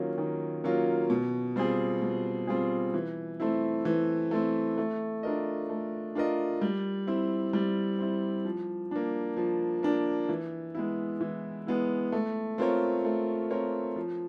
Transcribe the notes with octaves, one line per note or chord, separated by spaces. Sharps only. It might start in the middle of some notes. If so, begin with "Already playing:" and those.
Already playing: D#3 F#3 A#3 C#4 F4
D#3
F#3 A#3 C#4 F4
B2
G3 C4 F4 G#4
B2
G3 C4 F4 G#4
E3
A3 C4 E4
E3
A3 C4 E4
A3
D4 F4 A#4 D#5
A3
D4 F4 A#4 D#5
G3
C4 E4
G3
C4 E4
F3
A#3 D4
F3
A#3 D4
E3
G#3 B3 E4
E3
G#3 B3 E4
A3
C4 F4 A#4 C#5
A3
C4 F4 A#4 C#5
F3